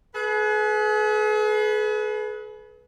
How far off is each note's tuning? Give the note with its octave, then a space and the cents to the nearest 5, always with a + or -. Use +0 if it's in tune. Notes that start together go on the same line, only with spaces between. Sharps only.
G#4 +40 B4 -10